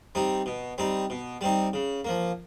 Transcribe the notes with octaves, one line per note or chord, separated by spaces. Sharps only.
G3 C4 D#4
B2
G3 C4 D#4
B2
G3 C4 D#4
C#3
F3 A#3